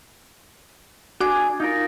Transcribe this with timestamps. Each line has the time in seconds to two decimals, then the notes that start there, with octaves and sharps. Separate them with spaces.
1.20 D4 F#4 G#4 D6
1.60 D#4 F4 A#4